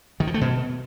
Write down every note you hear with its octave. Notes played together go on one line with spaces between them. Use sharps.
D#3
F3
A3
B2